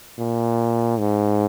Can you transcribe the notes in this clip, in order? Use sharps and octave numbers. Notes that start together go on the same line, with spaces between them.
A#2
G#2